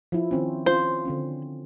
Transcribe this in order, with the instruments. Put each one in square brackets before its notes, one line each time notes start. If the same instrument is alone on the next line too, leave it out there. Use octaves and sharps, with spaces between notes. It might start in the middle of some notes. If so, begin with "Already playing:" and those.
[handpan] F3 E4
D#3 C4 C#4
[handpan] C#4 F4 [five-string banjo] C5
[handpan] D3 C4 C#4